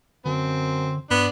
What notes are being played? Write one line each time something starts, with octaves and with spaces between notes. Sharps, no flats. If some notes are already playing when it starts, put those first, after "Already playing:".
F#2 D3 C4
G2 B3 D4